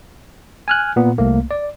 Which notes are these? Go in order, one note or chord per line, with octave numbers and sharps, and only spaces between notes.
G#5 F6 F#6
A#2 B3
C2 A3 A#3
D5